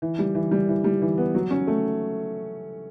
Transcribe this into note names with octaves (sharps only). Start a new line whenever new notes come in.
E3
G3
E3
G3
E3
G3
E3
B3
F#3
C#4
A3